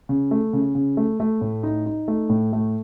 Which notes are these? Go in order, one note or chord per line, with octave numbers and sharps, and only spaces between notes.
C#3
A3
C#3
C#3
A3
A3
A2
D#4
D#4
A3
A2
A3